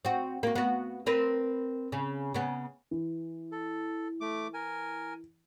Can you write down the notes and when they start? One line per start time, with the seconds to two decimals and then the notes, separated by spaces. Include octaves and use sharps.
0.05 C4 F#4
0.43 A#3 F#4
0.55 B3 F#4
1.06 C4 A#4 B4
1.92 C#3
2.34 C#3 B3
2.91 E3
3.52 A4
4.21 A3 D6
4.54 A#4 G#5